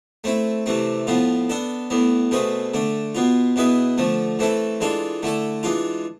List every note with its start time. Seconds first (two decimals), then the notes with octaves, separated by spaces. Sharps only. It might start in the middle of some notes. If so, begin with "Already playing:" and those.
0.24 A3 C4 E4
0.66 C3 E3 A3 C4
1.07 A2 F3 B3 F4
1.50 B3 D4 A4
1.90 A2 E3 B3
2.31 B2 A3 C4 G#4 B4
2.74 D3 A3 D4
3.15 B2 B3 F4
3.56 B2 B3 E4 G#4 B4
3.98 D3 F3 A3
4.39 E3 A3 C4 E4 A4
4.81 E3 G#3 D4 F4 A4
5.23 D3 A3 E4 A4
5.63 E3 G#3 D4 F4